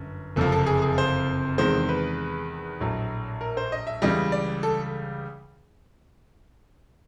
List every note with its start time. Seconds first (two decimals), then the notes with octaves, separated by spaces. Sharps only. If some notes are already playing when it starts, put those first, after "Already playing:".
Already playing: G1 F#2
0.36 F#1 F2 C3 F3 A4
0.52 A4
0.66 G#4
0.82 G#4
0.98 C5
1.58 E2 C3 D#3 G#3 C5
1.89 B4
2.81 A#1 A2 F#3
3.41 A#4
3.57 C5
3.72 D#5
3.87 E5
4.02 C#2 C#3 E3 G3 D#5
4.32 D5
4.63 A4